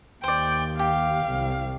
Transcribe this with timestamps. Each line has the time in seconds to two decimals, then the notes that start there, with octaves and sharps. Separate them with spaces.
0.24 D#2 C5 D5 G5
0.79 G4 F5
1.26 C2